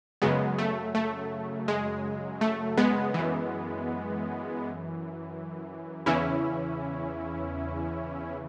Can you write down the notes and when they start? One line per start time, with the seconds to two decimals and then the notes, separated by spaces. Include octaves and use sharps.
0.22 F#2 C#3 F#3 G#3 B3
0.59 A3
0.95 A3
1.68 G#3
2.41 A3
2.77 G#3 B3
3.14 F#2 E3
6.06 E2 C#3 E3 C#4 E4